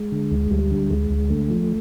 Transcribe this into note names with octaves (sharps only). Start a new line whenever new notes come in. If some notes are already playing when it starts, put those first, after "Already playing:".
Already playing: G#3
D3
D2
D2 G3
D3
D2 G#3
D2
D3 A3
F3